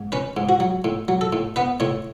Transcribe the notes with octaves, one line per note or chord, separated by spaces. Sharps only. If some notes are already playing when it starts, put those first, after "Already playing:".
Already playing: G#2
C#4 B4
G#2
F#4
F#3
A2
F#3
A4
A2
B3 B4
A2 C#5